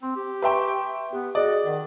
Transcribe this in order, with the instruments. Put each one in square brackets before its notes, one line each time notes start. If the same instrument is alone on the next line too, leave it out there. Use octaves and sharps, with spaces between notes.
[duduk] C4 [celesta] C6
[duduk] G4
[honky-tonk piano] B4 E5 G5 [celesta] A#5 C6 C#6
[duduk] B3 [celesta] G4
[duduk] F#4 [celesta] G#4 D#5 D#6 [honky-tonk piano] D5
[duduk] D#3 [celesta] D5 F#5